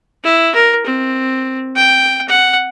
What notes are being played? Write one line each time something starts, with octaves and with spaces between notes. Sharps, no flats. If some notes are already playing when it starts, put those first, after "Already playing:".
E4
A#4
C4
G5
F#5